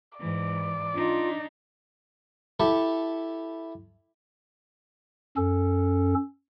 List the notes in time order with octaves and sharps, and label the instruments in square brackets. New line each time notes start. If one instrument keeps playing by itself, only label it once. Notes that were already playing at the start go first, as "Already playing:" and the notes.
[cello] G#2 E3 [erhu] D5
[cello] D4 D#4 [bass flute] F4
[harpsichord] E4 G4 A4
[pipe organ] F#2 C#4 A4